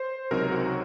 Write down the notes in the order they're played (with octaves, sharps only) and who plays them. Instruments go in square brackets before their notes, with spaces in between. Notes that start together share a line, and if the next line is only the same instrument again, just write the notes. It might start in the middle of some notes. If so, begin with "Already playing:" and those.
Already playing: [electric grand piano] C5
C#2 C3 F#3 C4 D#4 A#4
F#4